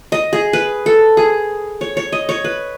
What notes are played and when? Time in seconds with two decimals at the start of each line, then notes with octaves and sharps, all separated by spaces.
0.12 D#5
0.33 G#4
0.53 B4
0.86 A4
1.17 G#4
1.81 C#5
1.97 C#5
2.12 D#5
2.29 C#5
2.44 B4